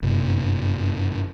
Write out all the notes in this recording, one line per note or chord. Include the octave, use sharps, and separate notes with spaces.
G1 F#2 C3 A#3